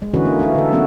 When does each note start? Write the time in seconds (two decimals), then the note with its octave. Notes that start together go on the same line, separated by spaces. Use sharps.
0.02 G#3
0.14 D3 E3 C#4 F#4 B4
0.25 A#3
0.39 A3 D#4 E4 F#4
0.55 D3 A4
0.72 E3 F#3 B3 C#4 E4 F#4